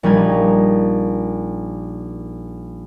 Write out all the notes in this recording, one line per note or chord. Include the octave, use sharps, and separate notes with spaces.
A#1 G3 D#4 G#6